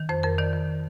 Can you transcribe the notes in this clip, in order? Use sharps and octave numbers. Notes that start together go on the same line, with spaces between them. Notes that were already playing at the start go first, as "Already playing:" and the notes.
Already playing: D#3
F2 C5
F2 A#4
D#3 D5
D#3